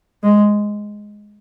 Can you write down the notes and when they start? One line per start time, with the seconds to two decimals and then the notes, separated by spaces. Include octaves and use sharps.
0.23 G#3